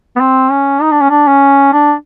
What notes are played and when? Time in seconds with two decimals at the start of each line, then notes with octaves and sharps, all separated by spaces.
0.16 B3
0.20 C4
0.51 C#4
0.82 D#4
0.92 D4
1.01 C#4
1.10 D4
1.28 C#4
1.73 D4